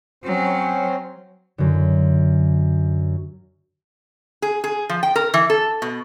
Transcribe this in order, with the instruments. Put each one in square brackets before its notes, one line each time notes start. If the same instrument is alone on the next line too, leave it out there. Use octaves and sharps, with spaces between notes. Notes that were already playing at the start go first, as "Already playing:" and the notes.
[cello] F#3 [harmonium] C4 C#4 C5
[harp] F#2 D3
[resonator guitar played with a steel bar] G#4
G#4
F3
G5
A#4
E3
A4
B2